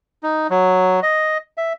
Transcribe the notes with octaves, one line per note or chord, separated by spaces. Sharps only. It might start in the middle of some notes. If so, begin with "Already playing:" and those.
D#4
F#3
D#5
E5